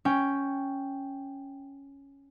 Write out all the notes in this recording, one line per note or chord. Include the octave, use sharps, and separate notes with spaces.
C#4 G5